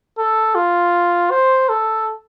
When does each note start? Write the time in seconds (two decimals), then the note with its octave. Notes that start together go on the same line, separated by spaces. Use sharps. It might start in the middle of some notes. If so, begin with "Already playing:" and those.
0.18 A4
0.55 F4
1.31 C5
1.69 A4